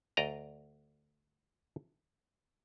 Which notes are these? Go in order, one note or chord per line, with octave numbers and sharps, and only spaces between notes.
D2 D5 D#5 A#5